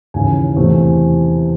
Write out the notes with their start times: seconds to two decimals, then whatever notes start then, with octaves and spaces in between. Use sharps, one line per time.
0.14 D#2 C#3 E3 G#5
0.56 E2 C3 E3 A3 C4